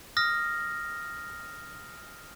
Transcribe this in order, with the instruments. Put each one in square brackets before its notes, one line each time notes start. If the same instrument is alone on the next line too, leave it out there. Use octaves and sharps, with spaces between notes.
[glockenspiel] D#6 F6 A#6